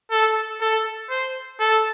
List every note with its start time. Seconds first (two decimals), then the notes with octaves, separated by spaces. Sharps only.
0.11 A4
0.61 A4
1.10 C5
1.60 A4